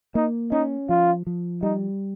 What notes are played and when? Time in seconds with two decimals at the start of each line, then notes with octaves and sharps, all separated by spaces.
0.15 A#3 D#4
0.52 C#4 D#4
0.89 F3 F4
1.27 F3
1.62 G3 D#4